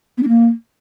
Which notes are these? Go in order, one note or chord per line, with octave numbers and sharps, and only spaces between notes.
B3
D4
A#3